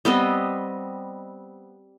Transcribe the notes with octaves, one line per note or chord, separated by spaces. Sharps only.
G3 B3 C4 D#5